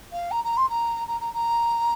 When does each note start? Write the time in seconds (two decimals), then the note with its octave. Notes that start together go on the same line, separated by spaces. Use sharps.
0.12 F5
0.31 A#5
0.44 A#5
0.57 C6
0.69 A#5
1.08 A#5
1.21 A#5
1.34 A#5